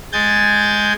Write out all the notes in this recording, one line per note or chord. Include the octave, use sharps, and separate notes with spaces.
G#3 G#5 G6 A6